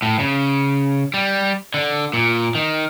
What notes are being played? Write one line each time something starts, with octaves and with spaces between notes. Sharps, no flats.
A2
C#3
G3
D3
A#2
D#3